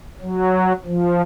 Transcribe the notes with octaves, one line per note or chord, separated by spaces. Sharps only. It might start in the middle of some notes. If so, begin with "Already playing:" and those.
F#3
F3